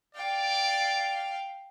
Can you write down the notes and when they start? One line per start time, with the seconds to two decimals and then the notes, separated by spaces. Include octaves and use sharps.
0.15 D5 F5 G5